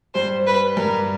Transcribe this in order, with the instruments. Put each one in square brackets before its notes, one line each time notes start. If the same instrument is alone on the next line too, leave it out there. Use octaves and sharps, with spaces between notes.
[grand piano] G2 G3 [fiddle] C5
[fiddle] B4
[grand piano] G2 G3 [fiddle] A#4